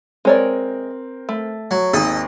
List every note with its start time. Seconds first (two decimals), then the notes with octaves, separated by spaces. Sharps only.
0.25 G#3 C4 A#4 C#5 D5
1.29 A3
1.71 F#3
1.93 G#1 D#2 A4 D#5